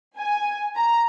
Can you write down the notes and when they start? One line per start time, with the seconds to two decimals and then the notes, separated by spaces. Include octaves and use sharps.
0.18 G#5
0.77 A#5